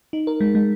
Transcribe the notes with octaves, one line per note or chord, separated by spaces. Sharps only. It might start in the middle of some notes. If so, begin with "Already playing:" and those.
D#4
A#4
G#3
G#3